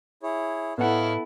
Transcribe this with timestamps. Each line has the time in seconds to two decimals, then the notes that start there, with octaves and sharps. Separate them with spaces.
0.23 E4 G#4 C#5
0.78 A2 B3 E4 A4 C#5 D#5 F5 F#5